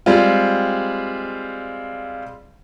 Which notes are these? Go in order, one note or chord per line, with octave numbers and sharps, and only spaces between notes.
G3 G#3 C4 F4